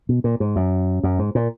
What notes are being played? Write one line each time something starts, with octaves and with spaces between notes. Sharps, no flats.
B2
A#2
G#2
F#2
F#2
G#2
A#2